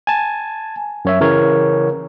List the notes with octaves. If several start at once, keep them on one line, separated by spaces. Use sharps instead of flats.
G#5 A5
F#2 C#5 E5
C#3 E3 A#4 C#5